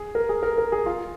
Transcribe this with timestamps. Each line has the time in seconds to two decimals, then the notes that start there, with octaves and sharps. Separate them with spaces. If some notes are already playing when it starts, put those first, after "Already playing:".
Already playing: G#4
0.15 A#4
0.29 G#4
0.43 A#4
0.58 A#4
0.72 G#4
0.86 F4